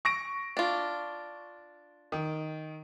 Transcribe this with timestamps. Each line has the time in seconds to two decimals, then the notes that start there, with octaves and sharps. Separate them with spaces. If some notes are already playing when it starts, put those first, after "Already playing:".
0.05 C#6 A#6 D7
0.57 D4 F4
2.12 D#3